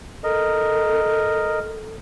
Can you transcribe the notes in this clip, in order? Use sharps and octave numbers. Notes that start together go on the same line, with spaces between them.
A4 A#4 D#5